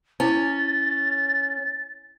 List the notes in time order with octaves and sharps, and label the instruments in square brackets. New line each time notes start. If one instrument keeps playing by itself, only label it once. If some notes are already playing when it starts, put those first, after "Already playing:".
[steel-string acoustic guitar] C#4 [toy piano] E4 D6 [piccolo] A6